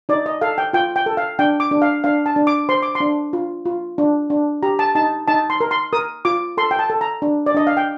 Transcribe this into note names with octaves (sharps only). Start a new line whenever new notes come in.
D#4 D5
D#5
A4 F5
G5
F4 G5
G5
A4
F5
D4 G5
D6
D4
F5
D4 F5
A5
D4
D6
C5 C6
D6
C6
D4
F4
F4
D4
D4
G4 A#5
A5
D#4 A5
D#4 A5
C6
A#4
C6
A#4 D#6
F4 D6
A4 C6
G5
A5
A4
A#5
D4
D5
D4 D#5
F5
G5